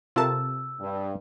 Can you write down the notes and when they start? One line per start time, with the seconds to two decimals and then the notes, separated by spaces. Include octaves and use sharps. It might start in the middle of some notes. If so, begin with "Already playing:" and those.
0.16 C3 F4 A4 A#4 A5 E6
0.79 G2